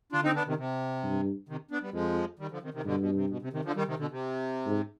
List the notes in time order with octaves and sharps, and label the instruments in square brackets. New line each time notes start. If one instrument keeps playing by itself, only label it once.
[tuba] D3 [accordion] D4 F4
[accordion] C4 D#4
B3 D4
C3 D#3
C3
[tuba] G2
[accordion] C3 D#3
B3 D4
G3 B3
[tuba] F2 [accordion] F3 G#3
[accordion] D#3 G3
D3 F3
C3 D#3
C3 D#3
[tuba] G2 [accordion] B2 D3
[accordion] B2
C3
B2
C3
C3 D#3
D3 F3
D#3 G3
C3 D#3
B2 D3
C3
[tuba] G#2